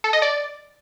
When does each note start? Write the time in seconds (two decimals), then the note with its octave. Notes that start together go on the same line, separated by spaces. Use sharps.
0.04 A4
0.13 D#5
0.22 D5